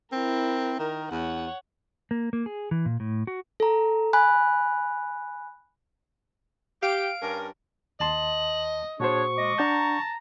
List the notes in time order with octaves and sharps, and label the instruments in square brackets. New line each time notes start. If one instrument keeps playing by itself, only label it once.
[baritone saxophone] C4 [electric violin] E4 A#4
[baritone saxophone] D#3 [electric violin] A#4
[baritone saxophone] E2 [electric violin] C#5 F#5
[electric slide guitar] A#3
A#3
G#4
E3
A#2
A2
F#4
[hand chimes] A4 A#5
G#5 B5 F#6
[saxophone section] G4 [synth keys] F5 D7
[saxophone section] G2 C#4 A#4
[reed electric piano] D#2 A5 C6 [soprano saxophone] D#5 [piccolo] F#7
[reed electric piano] A#2 F#4 C5 [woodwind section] D4 G#4 C#5 [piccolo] C#6
[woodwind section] G#3 D#5 D6
[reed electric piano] D4 F#5 G6 [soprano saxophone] A5 [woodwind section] A#5